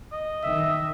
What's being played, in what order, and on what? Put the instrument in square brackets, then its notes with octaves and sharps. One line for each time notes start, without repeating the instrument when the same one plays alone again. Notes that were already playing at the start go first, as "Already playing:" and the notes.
[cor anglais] D#5
[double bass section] D#3 [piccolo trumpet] E5